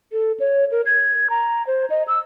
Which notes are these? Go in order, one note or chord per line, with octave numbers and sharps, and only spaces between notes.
A4
C#5
A#4
G#6
A#5
C5
D#5
E6